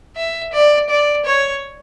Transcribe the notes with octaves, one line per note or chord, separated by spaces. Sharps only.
E5
D5
D5
C#5